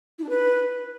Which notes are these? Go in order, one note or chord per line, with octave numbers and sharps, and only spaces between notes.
E4
D4
B4